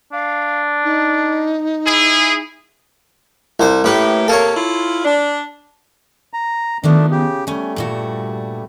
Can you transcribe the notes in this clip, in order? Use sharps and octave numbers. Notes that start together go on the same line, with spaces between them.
D4 F5
D#4
E4 G#4
C2 C5
A2 A#3 C#4 G4 B4
C3 A#3 A4 C#5
E4 F4
D4
A#5
D#3 F3 A3 B3 D4
C#3 G4
G3 A3 C#4 G#5
G2 A#2 F#4